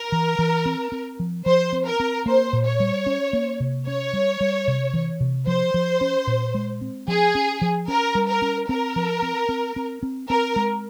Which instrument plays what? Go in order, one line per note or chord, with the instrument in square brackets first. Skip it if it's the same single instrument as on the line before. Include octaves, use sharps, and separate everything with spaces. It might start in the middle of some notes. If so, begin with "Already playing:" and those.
Already playing: [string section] A#4
[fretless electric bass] E3
E3
C4
C4
F3
[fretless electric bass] F3 [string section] C5
[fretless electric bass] C4
[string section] A#4
[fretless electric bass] C4
[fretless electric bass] A#3 [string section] C5
[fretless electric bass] A#2
[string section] C#5
[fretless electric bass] G3
C#4
A#3
C3
[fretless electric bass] C#4 [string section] C#5
[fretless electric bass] G3
G3
C3
E3
C3
[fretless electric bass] F3 [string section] C5
[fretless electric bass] F3
C#4
A#2
G#3
C4
[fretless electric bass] F3 [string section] G#4
[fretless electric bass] C#4
F3
[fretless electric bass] C#4 [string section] A#4
[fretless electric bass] G3
[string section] A#4
[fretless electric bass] C#4
[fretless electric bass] C4 [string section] A#4
[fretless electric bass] F3
C4
C4
C4
C4
[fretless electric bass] C4 [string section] A#4
[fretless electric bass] G#3